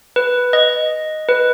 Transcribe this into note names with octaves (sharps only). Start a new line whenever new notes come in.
B4
D#5
B4